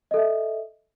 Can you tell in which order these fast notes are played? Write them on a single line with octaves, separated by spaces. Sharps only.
D#5 A4 E5